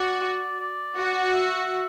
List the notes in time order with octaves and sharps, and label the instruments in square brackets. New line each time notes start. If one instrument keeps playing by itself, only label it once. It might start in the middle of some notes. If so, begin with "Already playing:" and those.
Already playing: [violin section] F#4 [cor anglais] D5
[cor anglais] D5
[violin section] F#4
[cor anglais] E5